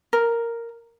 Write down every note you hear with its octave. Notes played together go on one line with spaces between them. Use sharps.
A#4